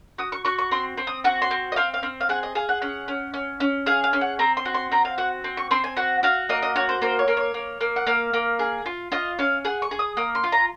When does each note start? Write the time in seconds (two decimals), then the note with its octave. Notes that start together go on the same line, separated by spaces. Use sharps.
0.18 F#4 D#6
0.32 C#6
0.45 F#4 C#6
0.58 C#6
0.71 C4 C6
0.97 C4
1.07 D#6
1.24 F#4 C#6
1.42 C6
1.51 C4
1.72 D#5
1.76 C4 F5
1.94 F5
2.03 C4
2.20 F5
2.29 G#4 F#5
2.43 D#5
2.55 G#4 F5
2.69 F#5
2.82 C#4 F#5
3.08 C#4
3.34 C#4
3.60 C#4
3.86 G#4 F5
4.04 F5
4.13 C#4
4.21 F#5
4.39 C4 A#5
4.57 C6
4.65 F#4
4.74 C6
4.92 C4 A#5
5.05 F5
5.18 F#4 F#5
5.44 C4
5.57 C#6
5.71 C4 C6
5.84 G#5
5.97 F#4 F#5
6.23 F#4 F5
6.49 A#3 D#5
6.62 D#5
6.76 F#4 C#5
6.89 C5
7.02 A#3 C5
7.19 C#5
7.28 A#3
7.37 C#5
7.54 A#3
7.81 A#3
7.96 F#5
8.07 A#3 F5
8.33 A#3
8.59 G#4
8.86 F4
9.12 F4 D#5
9.39 C#4 F5
9.65 G#4 F#5
9.82 C#6
9.91 G#4
9.99 D#6
10.17 A#3 D#6
10.35 C6
10.44 F4
10.52 A#5